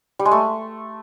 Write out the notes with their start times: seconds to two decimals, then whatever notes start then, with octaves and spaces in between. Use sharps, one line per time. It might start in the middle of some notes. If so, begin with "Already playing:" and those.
0.19 G3
0.25 G#3
0.31 A3